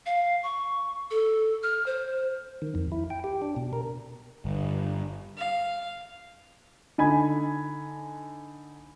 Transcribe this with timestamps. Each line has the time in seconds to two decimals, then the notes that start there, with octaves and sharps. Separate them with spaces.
0.06 F5
0.43 C#6
1.11 A4
1.63 F6
1.86 C5
2.62 D#3
2.75 F2
2.92 E4
3.10 G5
3.24 G4
3.42 D4
3.56 B2
3.73 A#4
4.45 G1
5.37 F5
6.98 D3 D#4 G#5 B5 G#6